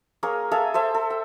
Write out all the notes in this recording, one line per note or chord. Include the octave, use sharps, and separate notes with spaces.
A#3 G#4 A#4 C#5
G#4 A4 E5 F5
A4 C5 E5
A4
G5